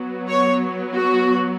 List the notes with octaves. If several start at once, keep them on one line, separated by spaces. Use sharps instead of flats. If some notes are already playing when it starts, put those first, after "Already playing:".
Already playing: F#3 B3
C#5
F#4